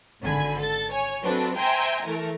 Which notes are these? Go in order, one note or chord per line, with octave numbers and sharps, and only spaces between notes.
G#1 D3 G#5 B5
A4 A6
C#5 G#5
F#3 A3 C4 D4 F#4 B4
C5 E5 G5 G#5 A#5 C6
E3 A3 A#4